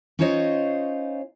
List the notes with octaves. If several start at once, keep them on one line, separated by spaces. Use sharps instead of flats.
C#4 D#4 F4 C5 C#5 D#5